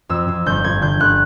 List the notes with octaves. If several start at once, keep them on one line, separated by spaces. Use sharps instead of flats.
F2 E6
F2
G1 G6
G1 G#6
D3 G6
G1 F#6